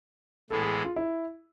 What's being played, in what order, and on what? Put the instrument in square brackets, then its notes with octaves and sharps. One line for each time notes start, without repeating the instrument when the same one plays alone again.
[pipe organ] A2 E3 G#3 B3 [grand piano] A4
[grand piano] G#4
G#4
F4
E4